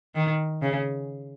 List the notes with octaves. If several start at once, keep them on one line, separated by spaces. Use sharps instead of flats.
D#3
C#3